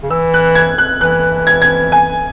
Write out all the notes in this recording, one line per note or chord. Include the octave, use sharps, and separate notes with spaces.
C#3
E3 E6
F#6
G#6
F#6
E3 F#6
G#6
G#6
G#5